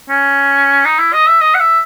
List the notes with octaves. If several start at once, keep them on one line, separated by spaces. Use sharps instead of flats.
C#4
D#4
E4
D#5
E5
D#5
F#5
E5